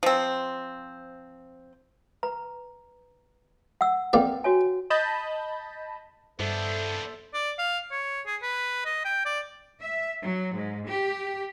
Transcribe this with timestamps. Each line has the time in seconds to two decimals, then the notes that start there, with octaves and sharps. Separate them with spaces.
0.03 F3 C4
2.23 B4 A#5
3.81 F#5 E6
4.13 F2 A#3 B4 D5 G5
4.44 F#4 C#5 G#5
4.90 D#5 A5 B5 G6 A6
6.40 G2 B3 D4 A4 C5 E5
7.34 D5
7.59 F5
7.91 C#5
8.26 G#4
8.42 B4
8.85 D#5
9.05 G5
9.25 D5
9.81 E5
10.21 F#3
10.54 G#2
10.86 G4